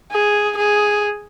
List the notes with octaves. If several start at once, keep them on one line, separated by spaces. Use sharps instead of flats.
G#4
G#4